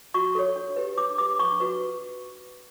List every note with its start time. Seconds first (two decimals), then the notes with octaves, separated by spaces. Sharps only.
0.14 F#4 C#6
0.35 A4 C#5
0.56 D4
0.76 G4 B4
0.98 D4 D6
1.18 G4 B4 D6
1.39 D4 C#6
1.60 F#4 B4